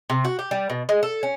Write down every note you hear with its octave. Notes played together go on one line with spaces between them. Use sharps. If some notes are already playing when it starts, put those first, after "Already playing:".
C3
F#4
G4
G3
B2
G#3
A4
C#4